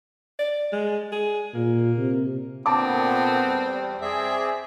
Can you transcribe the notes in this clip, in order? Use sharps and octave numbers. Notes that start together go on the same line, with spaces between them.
D5
G#3
G#4
A#2 A#3
C3
A#2 D3 B3 C4 A5 D6
E2 G3
C4 G#4 D5 E5